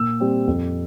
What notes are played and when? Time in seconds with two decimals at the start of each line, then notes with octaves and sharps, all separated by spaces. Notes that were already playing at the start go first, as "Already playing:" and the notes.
Already playing: A#2 E6
0.20 G3 C4
0.47 F2